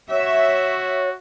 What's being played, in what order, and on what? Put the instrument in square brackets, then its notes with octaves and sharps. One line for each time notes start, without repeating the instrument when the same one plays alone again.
[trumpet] F#4 [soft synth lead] C#5 [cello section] E5